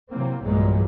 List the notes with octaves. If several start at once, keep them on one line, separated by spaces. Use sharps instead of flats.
C3 E3 F#3 A#3 C4
B1 G2 A#2 E3 F#3 G#3